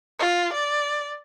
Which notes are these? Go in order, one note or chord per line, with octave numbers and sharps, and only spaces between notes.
F4
D5